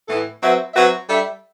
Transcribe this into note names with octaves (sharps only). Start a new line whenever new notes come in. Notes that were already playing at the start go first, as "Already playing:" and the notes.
A2 E3 B3 E4 A4
F#3 C4 F#4 B4 E5
F#3 C4 F#4 B4 E5
G3 D4 A4 E5